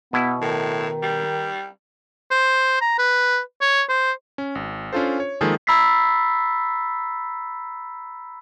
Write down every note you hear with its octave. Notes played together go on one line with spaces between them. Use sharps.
B2 B3 E4
A2 D#3
G3
C5
A#5
B4
C#5
C5
C#4
G#1
C#4 D4 F4 A4 C5
C#5
D#3 F3 G#3 A#3 G#4 A4
A#5 B5 E6 A6 B6 C7